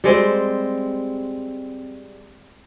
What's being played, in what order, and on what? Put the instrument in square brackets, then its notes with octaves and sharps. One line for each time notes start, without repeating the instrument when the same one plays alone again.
[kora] G3 G#3 C4